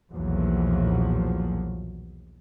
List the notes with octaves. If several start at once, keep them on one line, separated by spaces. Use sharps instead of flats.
B1 E2 A#2 F3 F#3